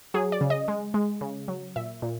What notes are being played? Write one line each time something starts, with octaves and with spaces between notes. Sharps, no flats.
F#3 G#4
D5
C#3
D#5
G#3
G#3
C#3
F#3
A#2 E5
A#2